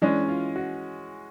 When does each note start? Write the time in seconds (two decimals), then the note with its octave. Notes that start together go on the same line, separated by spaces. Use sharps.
0.02 E3 G#3 C#4 D4
0.29 F4
0.56 F#4